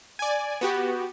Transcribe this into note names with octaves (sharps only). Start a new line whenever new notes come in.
D5 G#5
B3 F#4 G4